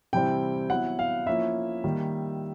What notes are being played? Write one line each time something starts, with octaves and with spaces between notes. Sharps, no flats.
C3 E3 G3 C4 E4 G5
F#3 B3 E4 F#5
F5
F3 A#3 C#4 E4 E5
D#3 G3 A#3